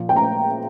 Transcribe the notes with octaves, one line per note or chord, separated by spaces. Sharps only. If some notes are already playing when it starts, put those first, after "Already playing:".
Already playing: A#2 F3
G5
A#5